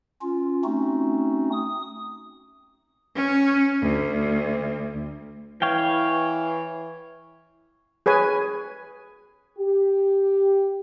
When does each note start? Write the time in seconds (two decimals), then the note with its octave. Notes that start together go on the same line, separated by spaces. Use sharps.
0.22 C#4 F4
0.65 A3 C4 C#4 D#4 F#4
1.52 D#6
3.16 C#4
3.82 D2
5.62 E3 C#5 F5 G5
8.06 G#4 B4 C#5 G#5
9.59 G4